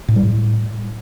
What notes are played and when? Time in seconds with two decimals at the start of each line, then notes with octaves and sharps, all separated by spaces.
0.08 A2
0.16 G3
0.23 A2